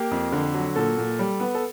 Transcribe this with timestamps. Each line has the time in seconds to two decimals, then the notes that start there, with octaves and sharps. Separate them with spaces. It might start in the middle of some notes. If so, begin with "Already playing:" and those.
Already playing: A#3 G4
0.11 F2
0.32 D3
0.54 F#3
0.76 A#2 A4
0.97 A#2
1.19 G3
1.40 B3
1.55 A4